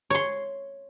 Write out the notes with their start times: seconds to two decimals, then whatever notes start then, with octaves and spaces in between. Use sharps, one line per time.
0.10 C#5 C6